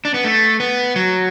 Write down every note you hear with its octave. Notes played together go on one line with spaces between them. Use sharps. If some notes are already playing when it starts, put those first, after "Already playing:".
D4
B3
A3
B3
F#3